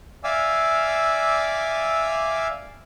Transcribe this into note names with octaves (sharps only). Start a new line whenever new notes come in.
D5 E5 F5 G#5 D6 E6